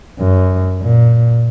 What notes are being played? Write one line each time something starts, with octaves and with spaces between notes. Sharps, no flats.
F#2
A#2